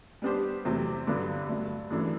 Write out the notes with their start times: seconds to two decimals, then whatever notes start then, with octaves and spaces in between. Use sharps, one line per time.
0.22 G3 B3 D4 G4 C5
0.65 E2 C3 F#3 A3 C4
1.07 G2 D3 F#3 B3
1.49 G2 F#3 A3
1.91 F#2 E3 A3 D4 A4